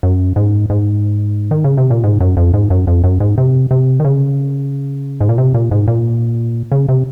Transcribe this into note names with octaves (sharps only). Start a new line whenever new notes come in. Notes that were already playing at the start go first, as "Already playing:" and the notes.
F#2
G#2
G#2
D#3
C#3
C3
A#2
G#2
F#2
F2
G#2
F#2
F2
F#2
G#2
C3
C3
D#3
C#3
G#2
A#2
C3
A#2
G#2
A#2
C#3
C3